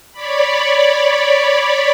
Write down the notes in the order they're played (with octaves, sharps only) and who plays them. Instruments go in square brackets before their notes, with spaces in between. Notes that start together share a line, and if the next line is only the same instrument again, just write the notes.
[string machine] C#5 D5 B5